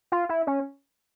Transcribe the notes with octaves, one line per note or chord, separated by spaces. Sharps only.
F4
E4
C#4